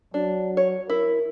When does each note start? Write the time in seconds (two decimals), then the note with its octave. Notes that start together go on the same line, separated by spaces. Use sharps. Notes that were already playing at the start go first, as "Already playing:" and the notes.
0.14 F#3 D4
0.57 C#5
0.90 E4 A#4